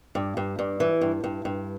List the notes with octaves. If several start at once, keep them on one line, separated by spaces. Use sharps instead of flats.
G2
G2
G2
E3
G2
G2
G2